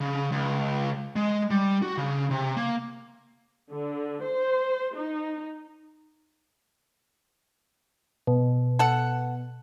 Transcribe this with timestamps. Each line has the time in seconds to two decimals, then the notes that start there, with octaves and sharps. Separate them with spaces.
0.01 C#3
0.32 C#2
1.16 G#3
1.51 G3
1.82 F#4
1.97 C#3
2.31 C3
2.56 A#3
3.70 D3
4.23 C5
4.95 D#4
8.27 B2
8.79 A4 F#5